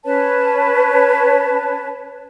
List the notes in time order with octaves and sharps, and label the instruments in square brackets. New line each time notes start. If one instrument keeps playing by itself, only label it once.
[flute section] C#4 B4 C#5 A5